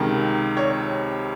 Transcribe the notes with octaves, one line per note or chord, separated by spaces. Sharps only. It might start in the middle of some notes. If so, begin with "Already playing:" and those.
Already playing: C#2 C3 D#3 A#4
C#5